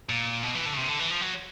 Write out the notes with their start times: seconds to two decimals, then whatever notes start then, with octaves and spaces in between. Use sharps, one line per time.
0.09 A#2
0.43 B2
0.54 E3
0.66 D3
0.73 C#3
0.77 C3
0.88 D3
0.99 E3
1.10 F3
1.22 F#3